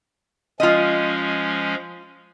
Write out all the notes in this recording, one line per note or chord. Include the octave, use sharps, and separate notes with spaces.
F3 G#3 C#4 F4 D#5